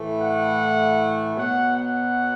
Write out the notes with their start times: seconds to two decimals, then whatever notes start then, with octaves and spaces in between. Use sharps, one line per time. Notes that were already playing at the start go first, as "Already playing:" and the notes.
Already playing: A2 E3 A3
0.19 F#5
1.36 B2 F#3 B3 F#5
1.76 F#5